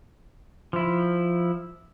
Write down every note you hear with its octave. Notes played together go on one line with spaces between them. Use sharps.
F3 E4